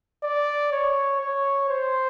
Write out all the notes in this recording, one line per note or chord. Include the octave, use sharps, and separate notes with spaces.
D5
C#5
C#5
C5